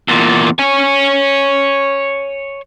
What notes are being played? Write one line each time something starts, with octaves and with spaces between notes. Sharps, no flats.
E2 A#2
C#5 G#5